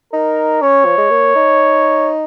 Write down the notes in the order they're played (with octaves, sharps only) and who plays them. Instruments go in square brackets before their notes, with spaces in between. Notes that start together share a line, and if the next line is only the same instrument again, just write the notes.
[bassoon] D#4 [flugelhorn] A#4
[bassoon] C#4 [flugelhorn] C#5
[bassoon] F3
G#3
A#3
D#4